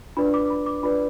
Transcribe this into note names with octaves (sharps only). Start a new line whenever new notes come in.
D4 F4 B4 D5 B5
D6
B5
D6
D4 F4 B4 D5 B5